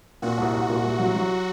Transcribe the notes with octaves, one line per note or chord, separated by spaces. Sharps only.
A#2 F#4
C2
C2
A#2
C2
F#3
F#3